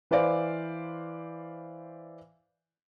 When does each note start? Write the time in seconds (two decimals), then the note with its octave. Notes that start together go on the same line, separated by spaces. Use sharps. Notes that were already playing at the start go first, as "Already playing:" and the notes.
0.11 E3 B4 C5 D5 F5